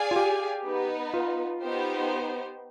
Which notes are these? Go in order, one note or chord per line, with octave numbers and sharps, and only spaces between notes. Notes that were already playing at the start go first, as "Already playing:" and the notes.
Already playing: G#4 D5 F5 G#5
F4
G4
B3 D#4 B4
F4
B3 D#4 G4 C5